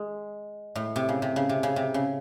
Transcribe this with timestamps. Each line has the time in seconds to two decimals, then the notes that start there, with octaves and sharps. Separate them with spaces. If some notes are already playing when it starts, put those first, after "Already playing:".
Already playing: G#3
0.76 A2
0.96 C3
1.09 C#3
1.22 C3
1.36 C#3
1.49 C3
1.63 C#3
1.76 C3
1.94 C#3